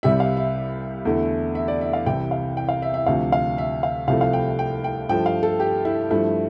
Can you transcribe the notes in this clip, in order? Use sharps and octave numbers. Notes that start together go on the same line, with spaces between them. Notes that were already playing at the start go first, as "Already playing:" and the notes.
C2 C3 G3 E5
F5
E5
E2 D3 A3
E5
D5
E5
F5
C2 C3 E3 G5
F5
G5
F5
E5
E5
D2 C3 F3 F5
F5
E5
F5
C2 C3 F3 A3 F5
F5
G5
G5
G5
G2 F3 A3 G5
F5
A4
G4
E4
G2 F3 A3 E4